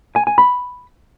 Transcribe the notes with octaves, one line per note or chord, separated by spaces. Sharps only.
G#5
G#5
B5